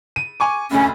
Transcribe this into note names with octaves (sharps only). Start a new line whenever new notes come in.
D#7
G#5 C#6 D6
F1 D2 C#4